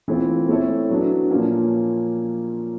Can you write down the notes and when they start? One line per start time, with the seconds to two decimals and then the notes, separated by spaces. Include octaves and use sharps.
0.08 E3 A3 C4 F4
0.49 A3 C4 E4 A4 C#5
0.90 F#3 B3 D4
1.30 A#2 F3 A#3 C#4